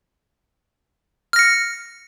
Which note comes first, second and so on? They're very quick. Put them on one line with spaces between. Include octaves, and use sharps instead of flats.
F6 A#6 C#7